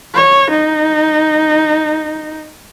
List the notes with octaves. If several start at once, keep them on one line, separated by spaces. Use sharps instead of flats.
C#5
D#4